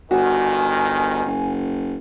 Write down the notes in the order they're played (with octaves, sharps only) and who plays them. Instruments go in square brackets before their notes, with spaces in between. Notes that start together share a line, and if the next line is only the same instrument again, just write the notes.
[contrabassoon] G1 [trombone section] C#2 D#3 [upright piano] F#4 [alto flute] G#5
[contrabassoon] F#1